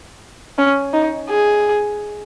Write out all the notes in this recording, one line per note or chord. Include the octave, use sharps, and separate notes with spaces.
C#4
D#4
G#4